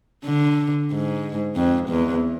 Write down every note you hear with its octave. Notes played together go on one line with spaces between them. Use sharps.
D3
G#2
F2
E2